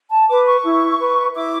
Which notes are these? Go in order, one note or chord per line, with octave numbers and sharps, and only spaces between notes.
A5
B4 D6
C#6
E4
B4
E4 D6